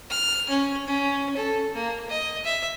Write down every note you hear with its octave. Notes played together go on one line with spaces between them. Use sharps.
F6
C#4
C#4
A4
A#3
D#5
E5